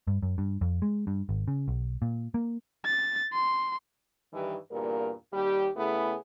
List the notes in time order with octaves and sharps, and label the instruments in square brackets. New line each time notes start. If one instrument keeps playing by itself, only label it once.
[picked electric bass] G2
F#2
G2
F2
G#3
G2
G#1
C#3
B1
A#2
A#3
[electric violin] A6
C6
[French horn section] G2 D#3 E3 G3
E2 G2 A#2 A#3 A#4
D#2 G3 G4
C#3 A3 B3 E4 G#4